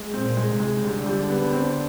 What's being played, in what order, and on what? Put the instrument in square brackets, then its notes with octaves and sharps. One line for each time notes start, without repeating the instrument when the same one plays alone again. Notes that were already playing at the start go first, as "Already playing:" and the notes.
Already playing: [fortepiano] G#3
[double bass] A#2 [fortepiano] C4
[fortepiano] G#3
[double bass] C3
[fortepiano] G#3
[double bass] D3 [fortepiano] G3
[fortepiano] G3
B3
C4